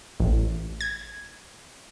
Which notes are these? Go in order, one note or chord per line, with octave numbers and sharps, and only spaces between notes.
A1
G#6